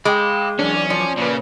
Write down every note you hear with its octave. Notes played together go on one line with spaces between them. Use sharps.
G#3 F5 G5 B5 D6
F#2 E3 C#4 D4 D5
F3 D5
A#2 C#3 B4 D5